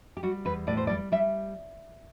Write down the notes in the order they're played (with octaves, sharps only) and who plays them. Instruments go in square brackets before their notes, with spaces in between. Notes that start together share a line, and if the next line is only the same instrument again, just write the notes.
[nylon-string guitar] G4
G3 F#4
E2 B4
A2 D5
C5
G3 D5
G3 E5